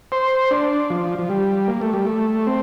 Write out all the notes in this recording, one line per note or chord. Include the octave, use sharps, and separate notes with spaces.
C5
D4
F3
F3
G3
A#3
A3
G3
A3
C4